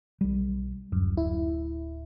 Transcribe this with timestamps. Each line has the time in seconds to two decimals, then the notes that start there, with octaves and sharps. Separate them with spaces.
0.21 B1 G3
0.92 D1 F#2
1.17 E4